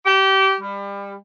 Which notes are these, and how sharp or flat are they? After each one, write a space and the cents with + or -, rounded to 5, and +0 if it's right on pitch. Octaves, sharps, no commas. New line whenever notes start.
G4 -25
G3 +30